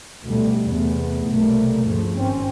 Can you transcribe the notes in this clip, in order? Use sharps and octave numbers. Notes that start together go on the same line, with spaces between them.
D2 B2 D3 G3 A3
E2 C3 A3 B3
B1 C3 G3 A3 A#3
D2 G2 C#3 F3 A3
G#1 C4 C#4